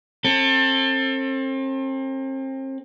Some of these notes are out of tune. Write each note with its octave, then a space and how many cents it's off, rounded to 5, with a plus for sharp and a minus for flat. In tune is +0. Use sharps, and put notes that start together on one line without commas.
C4 +35 A4 +25